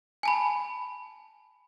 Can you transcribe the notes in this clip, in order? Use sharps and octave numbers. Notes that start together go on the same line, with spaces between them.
G#5 A5 B5